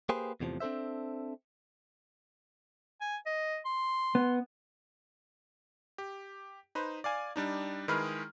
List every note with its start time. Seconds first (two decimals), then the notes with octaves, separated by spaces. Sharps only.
0.09 A#3 G4 G#4 B4 C5
0.40 E2 A2 C3 E3 F3
0.60 C4 D4 A4 C5 E5
3.01 G#5
3.26 D#5
3.66 C6
4.15 B3
5.98 G4
6.75 D#4 B4 C5
7.04 D5 F5 G#5
7.36 G3 D4 D#4
7.88 D#3 G#3 E4 G#4 B4 F6